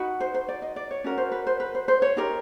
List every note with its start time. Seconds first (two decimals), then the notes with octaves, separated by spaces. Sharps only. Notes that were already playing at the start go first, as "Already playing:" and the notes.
Already playing: D#4 F#4 B4
0.20 C5
0.34 C5
0.49 D5
0.62 D#5
0.76 D5
0.91 C#5
1.04 C#4 F#4 A#4
1.18 C5
1.32 B4
1.47 C5
1.60 B4
1.75 C5
1.88 C5
2.02 C#5
2.17 D#4 G4 A#4